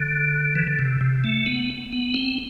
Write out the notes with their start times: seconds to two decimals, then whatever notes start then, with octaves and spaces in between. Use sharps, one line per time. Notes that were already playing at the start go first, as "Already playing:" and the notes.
Already playing: D3
0.55 E3
0.68 D3
0.79 C3
1.01 C3
1.24 A3
1.46 B3
1.93 B3
2.14 C4